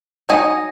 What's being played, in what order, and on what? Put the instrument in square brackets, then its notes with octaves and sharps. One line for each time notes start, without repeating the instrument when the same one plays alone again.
[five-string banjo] F#3 D#4 D#5 G#5